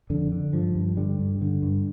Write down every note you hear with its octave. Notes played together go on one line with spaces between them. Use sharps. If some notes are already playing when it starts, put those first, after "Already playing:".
F2 D3
D3
G2 F3
G2
D3 G3
G2
D3
G2